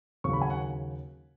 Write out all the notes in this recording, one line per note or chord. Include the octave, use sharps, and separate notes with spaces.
D#2 C#3 F#3 C#6
B5
G#5
F#5